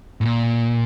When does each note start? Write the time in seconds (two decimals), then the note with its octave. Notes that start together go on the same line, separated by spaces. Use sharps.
0.21 A2
0.25 A#2